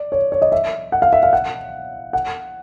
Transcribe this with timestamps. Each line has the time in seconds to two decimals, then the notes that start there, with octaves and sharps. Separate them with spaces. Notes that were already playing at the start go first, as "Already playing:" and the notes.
Already playing: D5
0.12 C#5
0.32 C#5
0.42 D#5
0.52 E5
0.92 F#5
1.02 F5
1.13 E5
1.23 F5
1.33 F#5
2.13 F#5